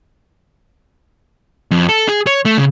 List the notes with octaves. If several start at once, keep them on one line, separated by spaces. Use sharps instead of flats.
F2
A4
G#4
C#5
A3
C#3